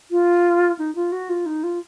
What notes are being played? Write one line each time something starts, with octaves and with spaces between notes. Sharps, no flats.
F4
D#4
F4
F#4
F4
D#4
F4